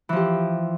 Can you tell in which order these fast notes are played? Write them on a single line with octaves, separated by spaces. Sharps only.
E3 F3 G4